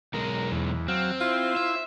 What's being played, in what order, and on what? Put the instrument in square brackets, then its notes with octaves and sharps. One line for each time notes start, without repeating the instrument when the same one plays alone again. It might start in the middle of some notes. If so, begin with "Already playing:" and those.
[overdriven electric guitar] B1 G#3 [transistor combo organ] A#4
[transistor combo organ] E2
[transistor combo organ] F#3 F5 [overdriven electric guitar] C4
[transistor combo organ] E4 C5 [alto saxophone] F4
[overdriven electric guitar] E5